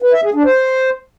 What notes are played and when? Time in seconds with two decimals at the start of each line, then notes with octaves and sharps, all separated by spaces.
0.02 B4
0.13 E5
0.24 G#4
0.34 D4
0.45 C5